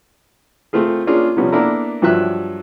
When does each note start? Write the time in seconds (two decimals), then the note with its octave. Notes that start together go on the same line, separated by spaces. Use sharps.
0.73 A3 C4 F4 G#4
1.07 A#3 C#4 D4 F4 G#4
1.37 C3 F3 G3 B3 C#4
1.52 A#3 B3 D4 E4 A4 A#4
2.02 G2 F3 F#3 E5 F#6